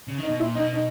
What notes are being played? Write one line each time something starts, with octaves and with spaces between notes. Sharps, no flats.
C#3
D#3
D#4
B2
A#2 E4
B2 D#4
D#4